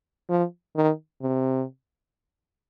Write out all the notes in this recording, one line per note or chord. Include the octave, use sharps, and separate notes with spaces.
F3
D#3
C3